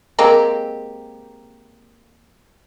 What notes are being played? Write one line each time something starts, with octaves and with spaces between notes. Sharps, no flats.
G#3 A#3 C4 G4